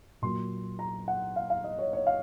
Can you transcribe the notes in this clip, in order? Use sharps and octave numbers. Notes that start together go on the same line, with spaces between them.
A#2 F#3 A#3 C6
A#5
F#5
F5
F5
D#5
C#5
C#5
F5